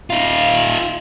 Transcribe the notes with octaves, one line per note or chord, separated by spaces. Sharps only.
D#4 F4